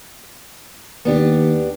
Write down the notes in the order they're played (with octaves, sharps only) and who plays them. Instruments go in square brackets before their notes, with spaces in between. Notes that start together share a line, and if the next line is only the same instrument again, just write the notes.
[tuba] D#2 [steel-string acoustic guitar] B3 D4 G4